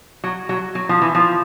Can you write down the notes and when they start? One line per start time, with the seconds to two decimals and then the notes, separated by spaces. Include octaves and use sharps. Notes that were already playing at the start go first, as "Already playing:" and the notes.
0.24 F#3
0.49 F#3
0.75 F#3
0.89 F3
1.02 E3
1.15 F3